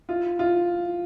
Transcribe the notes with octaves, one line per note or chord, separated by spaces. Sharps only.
F4
F4